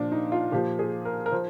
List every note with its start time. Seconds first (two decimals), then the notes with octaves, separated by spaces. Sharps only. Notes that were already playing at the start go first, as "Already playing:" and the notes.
Already playing: A#2 F3 D4
0.12 D#4
0.32 F4
0.52 A#2 F3 G4
0.79 G#4
1.05 A#4
1.26 A#4
1.32 F3 C5